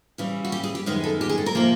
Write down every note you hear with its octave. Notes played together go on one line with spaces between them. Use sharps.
C#3 E3 G3
F#4
G4
G#4
G4
F#2 D#3 G#3 B3 G#4
A4
G4
G#4
A4
A#4
C3 F3 A#3